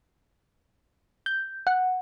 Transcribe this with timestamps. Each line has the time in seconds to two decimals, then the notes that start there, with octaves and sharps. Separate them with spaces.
1.26 G6
1.67 F#5